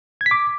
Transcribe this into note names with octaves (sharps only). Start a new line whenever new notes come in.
G#6
B6
D6